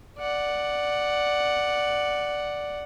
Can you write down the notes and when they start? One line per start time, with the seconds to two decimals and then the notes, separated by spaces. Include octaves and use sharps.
0.18 D5 F#5